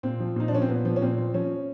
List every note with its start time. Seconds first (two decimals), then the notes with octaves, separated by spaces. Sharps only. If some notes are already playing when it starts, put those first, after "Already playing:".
0.03 A#2 C4
0.20 F3
0.36 A#2 D#4
0.48 D4
0.52 F3 C#4
0.62 C4
0.68 A#2 B3
0.85 F3
0.96 C#4
1.02 A#2 C4
1.18 F3
1.34 F3 C#4